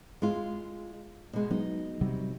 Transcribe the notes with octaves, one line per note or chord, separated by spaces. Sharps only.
G#3 F4
B2 G#3
F#3 B3 D#4
C3 F#3 G3